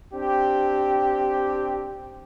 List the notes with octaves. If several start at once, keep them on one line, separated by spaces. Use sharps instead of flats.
C4 D4 G4